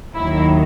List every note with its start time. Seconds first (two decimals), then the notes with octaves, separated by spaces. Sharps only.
0.15 D#2 D#3 F#3 E4